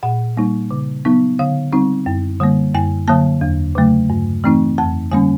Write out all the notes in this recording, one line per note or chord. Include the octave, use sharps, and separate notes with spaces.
A#2 F#5
G3 A#3 D#4
C#3
F#3 B3 D#4
D3 F5
G3 C4 D#4
F#2
D3 G3 A#3
F#2 G#5
D3 F#3 A#3 A5
E2
C#3 F#3 A3
G2
E3 A3 C4 D#4
F2 A5
D3 G3 A#3 C#4 G#5